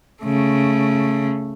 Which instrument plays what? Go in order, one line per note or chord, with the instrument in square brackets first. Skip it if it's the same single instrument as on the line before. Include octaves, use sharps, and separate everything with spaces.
[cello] C#3 A3